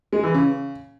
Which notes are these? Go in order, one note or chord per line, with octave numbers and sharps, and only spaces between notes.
G#3
E3
C#3